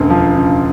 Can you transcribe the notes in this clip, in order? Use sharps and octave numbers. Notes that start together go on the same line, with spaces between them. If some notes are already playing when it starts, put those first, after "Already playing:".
Already playing: E1 D2 C#3
F3
C#3